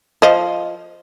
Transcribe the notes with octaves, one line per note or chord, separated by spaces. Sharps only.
F3 D#5